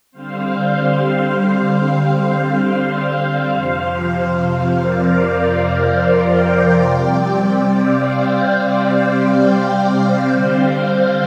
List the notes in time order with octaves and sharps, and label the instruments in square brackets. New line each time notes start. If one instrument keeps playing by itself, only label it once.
[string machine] D3 G3 C4 C5 F5
F2 C3 F3
C5 F5
A#4 D5
C5 F5
D5 G5
C3 G3 C4 D5 G5
D5 G5
C5 F5
C5 F5
D3 G3 C4